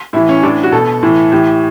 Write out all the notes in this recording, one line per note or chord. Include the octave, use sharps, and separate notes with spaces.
A2 E3 E4
C#4
A2 E3 D4
F#4
B2 A4
A2 E3
A2 E3 G4